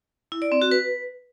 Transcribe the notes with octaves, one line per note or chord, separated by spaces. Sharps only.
E4
D5
C4
F#4
B4